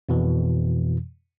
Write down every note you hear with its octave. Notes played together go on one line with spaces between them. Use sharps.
F2 B2 E3